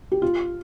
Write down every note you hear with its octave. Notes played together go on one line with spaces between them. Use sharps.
G4
F4